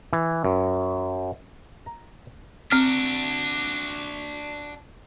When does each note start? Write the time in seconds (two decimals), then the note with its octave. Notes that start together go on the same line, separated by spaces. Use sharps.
0.13 E3
0.44 F#2
1.86 A#5
2.71 C4 D4 F#4 F6